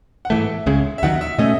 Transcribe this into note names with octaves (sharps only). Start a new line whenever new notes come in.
F#5
G#2 E3 A3 E5
C#2 C#3 G#3
E5
D#2 D#3 F#3 F#5
E5
B2 A3 C#4 D#5